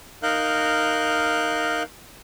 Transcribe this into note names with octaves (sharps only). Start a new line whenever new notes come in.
D#4 A#4 F5 F#6 G6